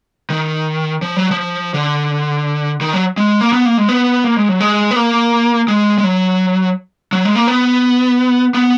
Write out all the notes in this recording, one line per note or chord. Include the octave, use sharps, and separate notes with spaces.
D#3
F3
F#3
F3
D3
D#3
F#3
G#3
A#3
B3
A#3
G#3
B3
A#3
G#3
F#3
G#3
B3
A#3
G#3
G#3
F#3
F#3
G#3
A#3
B3
B3